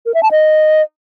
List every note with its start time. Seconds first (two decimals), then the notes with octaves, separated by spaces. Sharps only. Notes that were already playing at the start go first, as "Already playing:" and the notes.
0.06 A#4
0.14 E5
0.23 A5
0.31 D#5